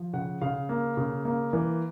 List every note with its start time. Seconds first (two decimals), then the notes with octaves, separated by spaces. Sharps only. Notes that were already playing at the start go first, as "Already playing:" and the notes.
Already playing: F3
0.13 C#3 F#5
0.41 C#3 F5
0.69 A#3
0.97 C#3
1.25 A#3
1.53 E3